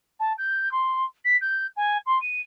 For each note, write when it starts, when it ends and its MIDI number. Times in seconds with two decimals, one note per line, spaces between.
0.20 0.33 81
0.38 0.72 91
0.72 1.04 84
1.25 1.37 95
1.41 1.67 91
1.77 1.98 80
2.06 2.18 84
2.21 2.41 99